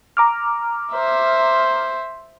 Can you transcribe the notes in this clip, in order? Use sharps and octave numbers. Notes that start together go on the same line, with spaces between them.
A#5 D6 F6
C5 E5